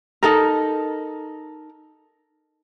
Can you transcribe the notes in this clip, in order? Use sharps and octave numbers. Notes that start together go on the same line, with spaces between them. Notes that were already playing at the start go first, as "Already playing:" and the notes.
D#4 A4 A#4